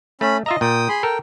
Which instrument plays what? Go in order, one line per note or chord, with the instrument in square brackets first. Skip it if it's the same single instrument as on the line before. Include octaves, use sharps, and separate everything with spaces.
[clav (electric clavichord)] A3 [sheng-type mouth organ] C#4 B5
[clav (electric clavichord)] F4 E5 A#5 [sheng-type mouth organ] D#5
[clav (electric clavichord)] A#2 [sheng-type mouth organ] G5 D#6
[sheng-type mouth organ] G#4 B5 C6
[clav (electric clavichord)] A4 A#4 [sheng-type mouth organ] G5